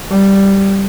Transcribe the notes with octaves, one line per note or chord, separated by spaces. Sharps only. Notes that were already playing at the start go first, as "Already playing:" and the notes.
G3